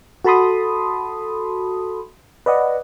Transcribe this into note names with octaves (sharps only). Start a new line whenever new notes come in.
F#4 A4 A5 B5 C6 D#6
B4 D5 D#5 F#5